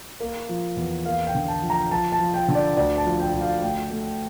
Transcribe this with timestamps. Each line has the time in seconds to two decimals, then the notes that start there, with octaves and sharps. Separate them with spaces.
0.20 A#3
0.49 F3
0.77 E2
1.06 A#3 F5
1.27 G5
1.34 D3
1.48 A5
1.62 F3
1.70 A#5
1.91 F3 A5
2.12 A5
2.20 F3
2.34 G5
2.48 D3
2.55 D5
2.77 D2 D5
2.98 A5
3.05 F3
3.20 G5
3.34 D2
3.41 F5
3.62 A3 G5
3.91 A3